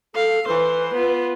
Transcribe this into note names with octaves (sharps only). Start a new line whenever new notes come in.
A4 F5
E3 B4 C5
B3 F4